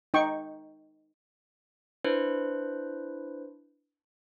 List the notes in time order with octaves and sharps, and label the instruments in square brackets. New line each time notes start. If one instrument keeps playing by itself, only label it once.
[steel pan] D#4 G5 C#6
[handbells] D4 E4 B4 C5